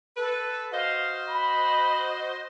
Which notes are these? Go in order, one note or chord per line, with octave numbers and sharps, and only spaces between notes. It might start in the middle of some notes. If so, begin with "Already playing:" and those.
A4 B4
F#4 C5 D#5 F5
B5